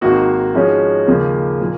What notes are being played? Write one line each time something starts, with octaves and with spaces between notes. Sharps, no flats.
G#1 G#2 D#3 A#3 F#4
G#2 F3 G#3 C#4
D#2 C#3 F3 A#3
A#2 F3 A#3